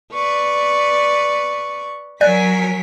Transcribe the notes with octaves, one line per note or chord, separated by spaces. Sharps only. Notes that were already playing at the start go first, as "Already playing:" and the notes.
B4 D5 C#6
F#3 A#4 D5 G#5 F#6 B6